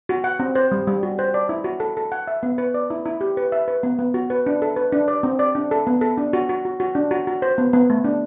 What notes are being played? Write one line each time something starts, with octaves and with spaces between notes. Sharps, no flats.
F#4
F#5
C4
C5
G3
G3
F#4
C5
D5
E4
F#4
A4
A4
F#5
E5
B3
B4
D5
E4
E4
G4
B4
E5
B4
B3
B3
F#4
B4
D4
A4
B4
D4
D5
C4
D5
D4
A4
B3
A4
D4
F#4
F#4
F#4
F#4
D4
F#4
F#4
C5
B3
B3
A3
D4